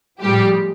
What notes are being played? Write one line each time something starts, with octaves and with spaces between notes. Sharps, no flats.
A2 F3 G3 G#3 G4